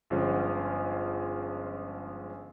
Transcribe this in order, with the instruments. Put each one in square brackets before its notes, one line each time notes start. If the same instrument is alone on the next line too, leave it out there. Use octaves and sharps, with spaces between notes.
[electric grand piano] G1 F3 G#3 C#4 C5 F#5